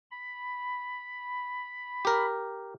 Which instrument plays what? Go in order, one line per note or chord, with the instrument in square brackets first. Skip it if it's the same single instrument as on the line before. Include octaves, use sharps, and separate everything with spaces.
[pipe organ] B5
[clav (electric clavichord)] G4 A#4